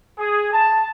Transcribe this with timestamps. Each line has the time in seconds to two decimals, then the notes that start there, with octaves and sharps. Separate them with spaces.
0.18 G#4
0.52 A5